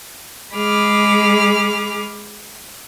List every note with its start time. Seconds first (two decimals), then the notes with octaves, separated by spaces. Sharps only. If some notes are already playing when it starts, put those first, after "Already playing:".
0.54 G#3 G#4 B5 D6 F6